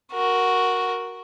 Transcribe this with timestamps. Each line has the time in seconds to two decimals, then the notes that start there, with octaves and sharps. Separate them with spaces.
0.12 F#4 A#4